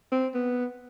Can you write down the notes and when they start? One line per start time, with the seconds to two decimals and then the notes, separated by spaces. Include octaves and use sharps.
0.12 C4
0.34 B3